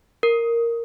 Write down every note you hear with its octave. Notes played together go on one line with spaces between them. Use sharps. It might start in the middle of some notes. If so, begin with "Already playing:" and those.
A#4